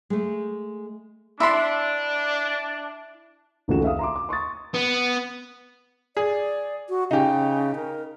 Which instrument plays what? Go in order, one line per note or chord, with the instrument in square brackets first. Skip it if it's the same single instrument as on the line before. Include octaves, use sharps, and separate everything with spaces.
[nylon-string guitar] G#3 A3
[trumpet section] D4 [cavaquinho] E4 B5 C6
[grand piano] F1 C#2 D#3 A3 F#4 E7
E5 F5 D#6
A#5 C6 D6
D6
C6 C#6 D#6 A6
[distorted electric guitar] B3
[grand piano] G#4 [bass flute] D5
[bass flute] F#4
[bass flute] C#3 [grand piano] D#4 G4
[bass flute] A#4